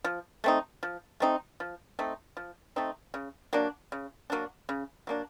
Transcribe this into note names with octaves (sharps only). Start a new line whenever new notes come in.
F3
A3 C4 D#4
F3
A3 C4 D#4
F3
A3 C4 D#4
F3
A3 C4 D#4
C#3
F#3 A#3 D4
C#3
F#3 A#3 D4
C#3
F#3 A#3 D4